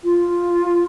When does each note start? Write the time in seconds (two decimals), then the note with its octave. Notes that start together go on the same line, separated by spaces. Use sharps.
0.04 F4